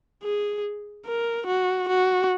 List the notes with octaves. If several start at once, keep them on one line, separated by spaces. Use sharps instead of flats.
G#4
A#4
F#4
F#4